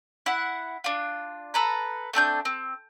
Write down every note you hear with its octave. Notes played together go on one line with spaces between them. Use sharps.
E4 F#5
D4 F4
A4 B4 A#5
A3 C4 D4 G6
C4